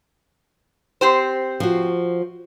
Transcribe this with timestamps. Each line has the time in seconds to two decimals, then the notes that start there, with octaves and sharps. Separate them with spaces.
1.01 C4 G4 C5
1.60 F3 F#4